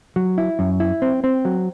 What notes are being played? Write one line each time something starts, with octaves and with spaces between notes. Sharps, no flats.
F#3
E4
F#2
E4
C4
C4
F#3